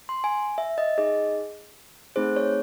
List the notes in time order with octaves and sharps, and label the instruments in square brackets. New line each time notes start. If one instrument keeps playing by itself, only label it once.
[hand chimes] C6
G#5
E5
D#5
D#4 G#4 D#5
A3 C4 D#4 G#4 C5
C#5